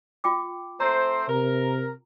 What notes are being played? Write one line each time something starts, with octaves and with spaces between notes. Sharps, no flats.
F4 G5 D6
A3 C4 C5 A#5
C3 A#4